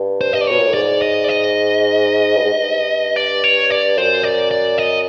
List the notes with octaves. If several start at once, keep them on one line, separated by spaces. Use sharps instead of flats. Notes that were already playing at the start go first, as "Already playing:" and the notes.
Already playing: G2
C5
G2 D#5
D5
B2 C#5
A#2
A2
G#2 D5
D#5
D5
D#5
G2
G#2
G2
D5
C#5
D5
F#2 C5
D5
D5
D#5